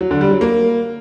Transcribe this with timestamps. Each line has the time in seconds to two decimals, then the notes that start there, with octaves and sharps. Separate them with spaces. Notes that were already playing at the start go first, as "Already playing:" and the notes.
0.01 F#3
0.11 D3
0.21 G3
0.31 F#3
0.41 A#3